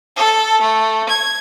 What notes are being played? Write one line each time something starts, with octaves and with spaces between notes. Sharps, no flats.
A4
A3
G#6